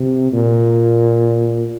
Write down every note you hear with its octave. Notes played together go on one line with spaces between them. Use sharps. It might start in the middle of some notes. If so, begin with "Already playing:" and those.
Already playing: C3
A#2